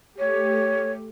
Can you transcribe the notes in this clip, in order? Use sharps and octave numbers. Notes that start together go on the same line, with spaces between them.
A3 G4 C#5